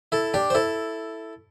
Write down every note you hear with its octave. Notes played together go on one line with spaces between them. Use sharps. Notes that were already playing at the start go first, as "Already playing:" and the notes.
E4 A4
D4 G4
C5
E4 A4